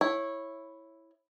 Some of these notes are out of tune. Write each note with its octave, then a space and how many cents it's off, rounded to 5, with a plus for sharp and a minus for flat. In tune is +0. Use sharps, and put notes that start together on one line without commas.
E4 +0 C#5 -15